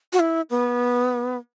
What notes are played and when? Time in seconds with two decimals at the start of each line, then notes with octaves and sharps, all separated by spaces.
0.13 F#4
0.20 E4
0.50 B3